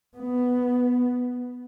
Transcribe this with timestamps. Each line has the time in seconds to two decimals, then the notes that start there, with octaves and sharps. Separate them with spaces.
0.17 B3